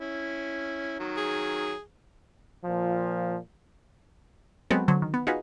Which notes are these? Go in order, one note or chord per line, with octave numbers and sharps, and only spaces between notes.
C#4 E4
D#3 F#3
G#4
A#2 F3
F#3 G#3 B3 C4 F#4 A4
D3 F#3 C5
D#3
B3
D#4 F4 F#4 G#4 B4